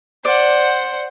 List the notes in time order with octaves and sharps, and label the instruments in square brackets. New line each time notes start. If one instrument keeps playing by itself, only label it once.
[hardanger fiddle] C5 F#5 [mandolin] D5